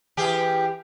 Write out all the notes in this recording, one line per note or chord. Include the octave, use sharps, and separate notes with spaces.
E3 G4 G#4